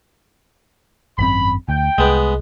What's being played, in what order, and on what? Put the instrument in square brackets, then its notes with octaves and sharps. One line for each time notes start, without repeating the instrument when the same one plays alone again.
[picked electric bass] G#1 F#2 C4 [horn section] B5
[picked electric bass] D2 [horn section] G5
[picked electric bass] C2 [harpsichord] G#3 B3